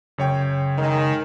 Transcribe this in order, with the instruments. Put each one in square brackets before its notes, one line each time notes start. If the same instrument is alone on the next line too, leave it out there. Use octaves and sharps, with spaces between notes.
[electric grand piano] F#2 C#5 G5 [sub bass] C#3
[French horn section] D#3 G#3